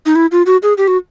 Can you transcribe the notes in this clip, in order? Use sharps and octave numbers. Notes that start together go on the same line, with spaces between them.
D#4
E4
F4
F#4
G#4
G4
F#4